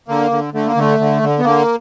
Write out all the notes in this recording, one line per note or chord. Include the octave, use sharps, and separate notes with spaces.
D3 A#3
D3
D3 A3
A#3
D3 A3
D3
D3
B3
D3 A#3